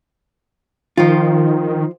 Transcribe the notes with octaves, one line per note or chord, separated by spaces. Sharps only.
D#3 F3 F4